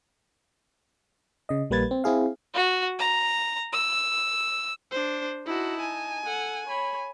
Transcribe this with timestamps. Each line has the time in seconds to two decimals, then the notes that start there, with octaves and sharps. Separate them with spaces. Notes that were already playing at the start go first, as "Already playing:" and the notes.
1.49 C#3 D#5
1.70 A#1 G3 A#3 B4 G#6 A6
1.91 C4
2.04 C4 E4 G#4 F5
2.54 F#4
2.99 A#5
3.73 E6
4.91 D4 C5
5.46 D#4 E4 F#4 A5
5.80 G#5
6.25 A4 F#5
6.66 C#5 B5